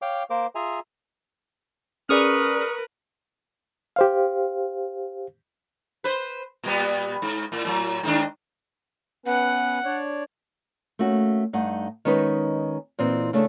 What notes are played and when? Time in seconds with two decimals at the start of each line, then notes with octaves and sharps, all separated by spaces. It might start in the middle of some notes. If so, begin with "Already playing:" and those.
0.02 C#5 F5 G5 D6
0.30 A#3 A#4 C5 D6
0.55 F4 G#4 E5 G#5 A#5
2.09 C#4 G#4 A#4 B4 D5 C#6 D#6 F6
3.96 G4 C5 F5
6.04 B4 C5
6.63 A#2 G3 B3
7.22 G#2
7.52 A2
7.65 A2 F#3
8.03 G#2 D#3 D4
9.26 B3 C#4 B4 F#5
9.85 D4 C#5 D5
10.99 A3 A#3 C#4 F#4
11.53 G2 A3 D#4 F#5
12.05 D#3 G#3 B3 C#4 D#4 B4
12.99 A#2 E3 C4 D#4
13.33 C#3 A3 D4 G#4 A4